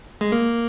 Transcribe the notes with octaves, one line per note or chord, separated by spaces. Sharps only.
G#3
A#3